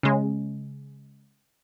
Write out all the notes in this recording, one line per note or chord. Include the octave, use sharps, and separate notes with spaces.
C#3 G#3